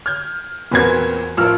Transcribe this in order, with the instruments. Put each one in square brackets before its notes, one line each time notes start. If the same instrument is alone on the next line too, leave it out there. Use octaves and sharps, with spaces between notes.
[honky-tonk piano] F6 G6 G#6
[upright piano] E2 G#6 [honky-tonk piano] A#2 C4 F#4 [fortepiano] A#4 B4
[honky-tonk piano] A1 A#4 [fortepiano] F3 E6 F6